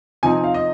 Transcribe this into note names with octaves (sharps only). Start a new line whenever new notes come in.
C3 F3 C4 D#4 G#5
F5
D#5